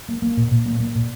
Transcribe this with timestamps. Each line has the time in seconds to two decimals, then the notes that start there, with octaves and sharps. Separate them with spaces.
0.09 A#3
0.22 A#3
0.37 A#2
0.51 A#2
0.66 A#3
0.80 A#3
0.95 A#2